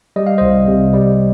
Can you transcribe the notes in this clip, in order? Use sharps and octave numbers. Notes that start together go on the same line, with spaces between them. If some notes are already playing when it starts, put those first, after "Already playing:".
G3 D#5
F5
C2 C5 D#5
C3
G3